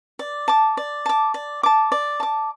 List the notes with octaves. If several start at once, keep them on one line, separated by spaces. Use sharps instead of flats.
D5
A5 D6
D5
A5 D6
D5
A5 D6
D5
A5 D6